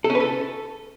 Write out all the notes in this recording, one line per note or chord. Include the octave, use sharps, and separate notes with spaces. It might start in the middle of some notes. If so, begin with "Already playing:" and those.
A4
C#4
B4
A4